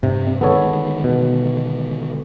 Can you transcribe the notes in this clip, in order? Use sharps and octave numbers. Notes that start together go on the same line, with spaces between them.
G2 C3
D3 D#3 G#3 B3 A4 C#5
B2